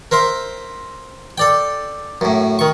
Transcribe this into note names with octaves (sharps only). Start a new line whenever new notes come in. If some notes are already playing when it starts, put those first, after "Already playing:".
A#4 C5 E5 C6
A4 D5 G5
F#2 A2
D#3 C#6